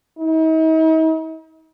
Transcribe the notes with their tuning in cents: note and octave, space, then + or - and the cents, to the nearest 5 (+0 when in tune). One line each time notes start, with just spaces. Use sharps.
D#4 +45